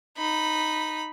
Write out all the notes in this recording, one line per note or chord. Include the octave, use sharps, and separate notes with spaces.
D#4 B5